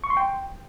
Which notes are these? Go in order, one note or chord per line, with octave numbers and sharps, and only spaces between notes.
C#6
C6
G5